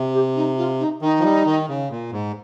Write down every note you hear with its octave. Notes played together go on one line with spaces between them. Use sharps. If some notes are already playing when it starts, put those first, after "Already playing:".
Already playing: C3
G4
D#4
F4
D#4
D#3 D#4
F3
G3
D#3
C#3
A#2
G#2